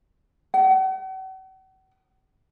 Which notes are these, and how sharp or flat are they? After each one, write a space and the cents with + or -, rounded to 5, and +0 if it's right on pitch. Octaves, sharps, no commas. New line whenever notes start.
F#5 +45